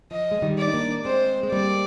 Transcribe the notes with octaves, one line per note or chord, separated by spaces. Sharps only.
F3 D#5
G#3
D#3 G3
D5
D#4
A#3 D4
G#3 C4 C5
G#3
G3 A#3 D5